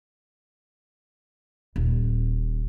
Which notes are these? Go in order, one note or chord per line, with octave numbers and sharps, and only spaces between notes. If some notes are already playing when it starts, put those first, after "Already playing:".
D#1